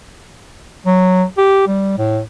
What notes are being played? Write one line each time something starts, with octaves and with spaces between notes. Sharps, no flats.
F#3
G4
G3
A2